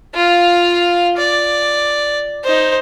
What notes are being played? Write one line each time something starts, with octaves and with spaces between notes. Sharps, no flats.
F4 F5
D5
D#4 C5